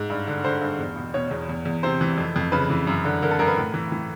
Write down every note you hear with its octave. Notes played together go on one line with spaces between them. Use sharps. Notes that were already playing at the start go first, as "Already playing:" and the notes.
Already playing: G#2
G2
D3
D3 C5
G2
E2
B2
B2 C#5
E2
E2
E2
C3 C5
E3
F2
F2
C#3 B4
E3
F#2
D3
D3 A#4
A4
F#2 A#4
B4
A2
E3
E3